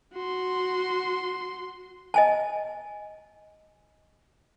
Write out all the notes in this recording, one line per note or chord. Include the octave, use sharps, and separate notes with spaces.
F#4 C6
D#5 G#5 A5